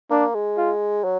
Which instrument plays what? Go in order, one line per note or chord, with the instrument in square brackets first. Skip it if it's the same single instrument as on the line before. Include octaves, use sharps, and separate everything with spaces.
[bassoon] A#3 [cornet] D4
[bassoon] G#3
[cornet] F4
[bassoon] F#3